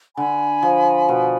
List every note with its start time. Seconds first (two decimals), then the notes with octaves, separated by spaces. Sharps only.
0.16 D3 G#5 B5
0.63 F3
1.09 B2